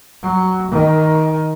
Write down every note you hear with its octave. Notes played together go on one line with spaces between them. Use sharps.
F#3
D#3